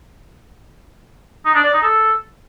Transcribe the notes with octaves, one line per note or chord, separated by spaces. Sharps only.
D#4
D4
D5
D#4
A4